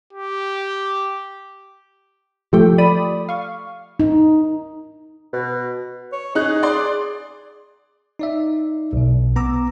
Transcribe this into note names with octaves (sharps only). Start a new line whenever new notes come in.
G4
F3 A3 G4 G5
D5 B5 D#6
F5 C#6
D#4
B2
C#5
D#4 G#4 F#6
D5 C6
D#4 D5 E5
B1 B2
B3 A#5 D6 E6